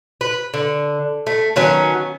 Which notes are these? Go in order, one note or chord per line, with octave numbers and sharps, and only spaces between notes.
B4
D3
A3
D#3 F#3 B3 C#4